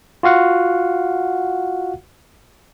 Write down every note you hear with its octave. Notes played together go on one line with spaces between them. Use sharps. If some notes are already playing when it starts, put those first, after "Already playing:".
F4 F#4 F5 F#5